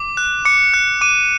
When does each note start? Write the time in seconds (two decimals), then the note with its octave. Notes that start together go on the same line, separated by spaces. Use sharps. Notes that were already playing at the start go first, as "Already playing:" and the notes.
Already playing: D6
0.17 F#6
0.45 D6 C#7
0.74 F#6
1.01 D6 D#7